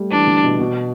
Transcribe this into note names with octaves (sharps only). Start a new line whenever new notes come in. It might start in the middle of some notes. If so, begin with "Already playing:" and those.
Already playing: G3 A3
E3 D4
D3
B2
B2